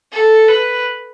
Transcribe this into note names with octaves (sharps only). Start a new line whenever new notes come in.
A4
B4